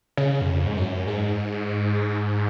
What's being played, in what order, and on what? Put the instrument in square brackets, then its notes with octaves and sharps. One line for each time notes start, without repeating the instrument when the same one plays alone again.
[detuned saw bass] C#3
F#2
F2
G#2
F#2
G#2